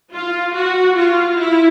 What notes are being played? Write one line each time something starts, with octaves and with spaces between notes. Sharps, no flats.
F4
F#4
F4
E4